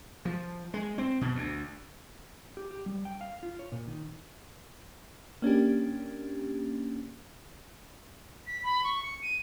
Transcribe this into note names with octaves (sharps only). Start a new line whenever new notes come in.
F3
G#3
C4
B2
D2
G4
G4
G3
G5
F5
F4
C#5
A#2
D#3
A#3 C#4 D4 G4
B6
B5
C#6
C#7
D#7